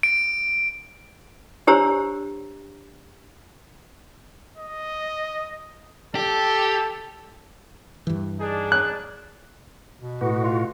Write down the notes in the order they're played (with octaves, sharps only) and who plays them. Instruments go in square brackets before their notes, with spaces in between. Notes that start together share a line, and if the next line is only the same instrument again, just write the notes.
[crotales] D7
[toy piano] D4 G4 C5 C#5 A#5 E6
[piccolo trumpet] D#5
[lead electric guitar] G4 [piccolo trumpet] A4
[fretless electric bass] G2 E3
[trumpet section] D4 D#4 G#4
[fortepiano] F#6
[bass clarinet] B2
[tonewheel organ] A2 F#4 [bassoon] B3
[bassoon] F4